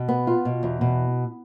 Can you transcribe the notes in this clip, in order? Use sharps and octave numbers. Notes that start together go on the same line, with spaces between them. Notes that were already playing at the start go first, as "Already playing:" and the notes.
Already playing: B2
B3
F4
B2
E2
B2